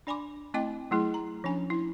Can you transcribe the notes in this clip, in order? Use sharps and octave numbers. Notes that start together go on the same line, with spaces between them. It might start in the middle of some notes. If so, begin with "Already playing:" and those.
D4 D5 G#5 B5 C6 D6
A3 C4 E4 D#5 G5 D6
F#3 A3 E4 G#4
A#5
F3 C#4 D4 G#5
E4